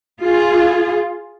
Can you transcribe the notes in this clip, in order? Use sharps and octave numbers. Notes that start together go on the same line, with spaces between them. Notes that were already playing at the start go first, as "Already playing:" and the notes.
F4 G#4